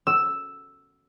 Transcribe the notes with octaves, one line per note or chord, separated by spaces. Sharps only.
E6